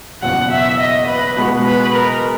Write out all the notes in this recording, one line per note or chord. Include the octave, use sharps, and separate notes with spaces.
F#1 E2 B2 F#5
E5
D#5
B4
B2 G#3 B3 F#4
B4
A#4